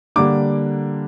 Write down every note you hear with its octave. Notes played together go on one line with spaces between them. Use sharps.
D3 G3 A#3 D4 D6